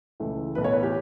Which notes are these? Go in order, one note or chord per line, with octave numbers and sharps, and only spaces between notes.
C#2 C#3 E3 A3
B1 A2 E3 B4
C#5
B4
G4